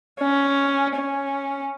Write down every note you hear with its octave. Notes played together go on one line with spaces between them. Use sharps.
C#4
C#4